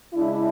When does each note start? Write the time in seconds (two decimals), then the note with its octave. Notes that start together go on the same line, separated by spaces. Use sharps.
0.14 C#3 G#3 D4 E4